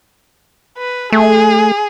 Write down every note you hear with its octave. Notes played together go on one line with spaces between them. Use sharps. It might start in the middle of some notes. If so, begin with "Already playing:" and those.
B4
A3 G#4